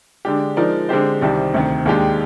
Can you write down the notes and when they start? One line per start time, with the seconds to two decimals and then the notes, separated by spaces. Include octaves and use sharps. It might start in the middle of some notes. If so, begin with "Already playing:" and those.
0.25 D3 G#3 D4 G4
0.56 F3 G#3 D#4 A#4 D5
0.89 D3 G#3 C4 G4 C5
1.21 C2 C3 D#3 G3
1.54 D2 C3 D#3
1.86 D#2 D#3 G#3 D4 G4